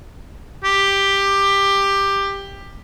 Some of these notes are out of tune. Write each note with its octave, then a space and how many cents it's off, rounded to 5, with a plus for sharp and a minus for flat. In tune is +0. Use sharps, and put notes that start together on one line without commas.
G4 +10